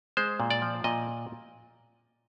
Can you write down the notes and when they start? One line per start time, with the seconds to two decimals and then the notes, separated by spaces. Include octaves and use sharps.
0.17 G#3 C5
0.40 A#2
0.50 D5
0.62 F3
0.84 A#2 D#5